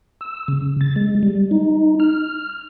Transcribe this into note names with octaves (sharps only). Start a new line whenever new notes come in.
E6
C#3
A6
G#3
G3
D#4
F6